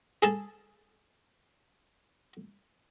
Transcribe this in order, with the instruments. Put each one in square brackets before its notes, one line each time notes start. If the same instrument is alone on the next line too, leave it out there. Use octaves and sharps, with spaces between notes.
[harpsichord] G#4 A4 A5